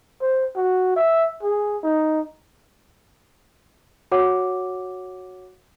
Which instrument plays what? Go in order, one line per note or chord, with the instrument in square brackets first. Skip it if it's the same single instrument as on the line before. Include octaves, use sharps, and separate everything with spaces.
[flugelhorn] C5
F#4
E5
G#4
D#4
[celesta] F#4 C#5 F#5 D6